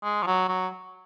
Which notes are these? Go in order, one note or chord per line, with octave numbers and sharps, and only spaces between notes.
G#3
F3
F#3
F#3